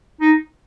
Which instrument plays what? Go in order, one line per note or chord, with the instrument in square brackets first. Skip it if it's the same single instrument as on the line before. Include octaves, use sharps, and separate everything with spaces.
[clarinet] D#4